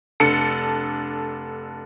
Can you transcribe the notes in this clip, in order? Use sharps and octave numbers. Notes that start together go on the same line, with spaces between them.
F1 D4 A4 C#7